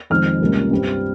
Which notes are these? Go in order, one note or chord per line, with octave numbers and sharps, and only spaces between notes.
F2 D#3 G#3 C4 F6
C#2 C3 G3 A#3 C#4
G2 G3 C4